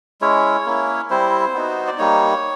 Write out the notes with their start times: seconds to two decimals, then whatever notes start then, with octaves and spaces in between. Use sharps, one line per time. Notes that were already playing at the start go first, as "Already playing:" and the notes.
0.21 G#3 C#4 E4 C#5
0.66 A#3 C#4 E4
1.10 G3 C4 E4 C5
1.54 B3 D#4 F#4
1.87 D5
1.98 G3 A#3 D#4 C#5